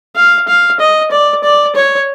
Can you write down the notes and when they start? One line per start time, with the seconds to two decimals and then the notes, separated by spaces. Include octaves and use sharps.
0.16 F5
0.48 F5
0.80 D#5
1.11 D5
1.44 D5
1.75 C#5